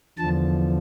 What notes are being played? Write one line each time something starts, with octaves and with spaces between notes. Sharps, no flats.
E2 D3 F3 A5